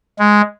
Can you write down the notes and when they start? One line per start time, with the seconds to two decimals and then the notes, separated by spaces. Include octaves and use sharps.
0.19 G#3